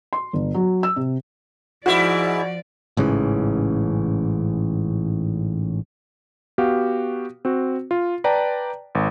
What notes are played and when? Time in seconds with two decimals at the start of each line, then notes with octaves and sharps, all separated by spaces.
0.13 C6
0.33 G1
0.54 F#3
0.83 E6
0.96 C3
1.86 G#2 F3 E4 F#4 D5
2.97 A1 G#2 C#3 E3
6.58 B3 F#4 G4 F5
7.45 C4 F#4
7.91 F4
8.24 B4 D5 G5 A5 A#5
8.95 G#1